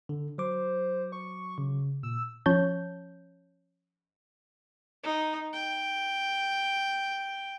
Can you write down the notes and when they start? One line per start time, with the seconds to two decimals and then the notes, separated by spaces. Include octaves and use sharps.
0.09 D3
0.38 F#3 C5 D6
1.12 C#6
1.58 C#3
2.03 A#2 E6
2.46 F3 C#4 C#5 A5 G6
5.04 D#4
5.53 G5